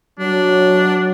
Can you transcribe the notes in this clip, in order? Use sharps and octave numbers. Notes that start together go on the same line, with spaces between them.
F#3 D4